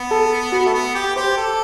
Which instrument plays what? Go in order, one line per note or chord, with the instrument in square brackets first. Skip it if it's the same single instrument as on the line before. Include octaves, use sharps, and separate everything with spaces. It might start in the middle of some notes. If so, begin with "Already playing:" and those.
Already playing: [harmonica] B3
[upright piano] A4
F#4
[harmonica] A3
B3
G4
[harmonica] G4 [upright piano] C5
[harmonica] A4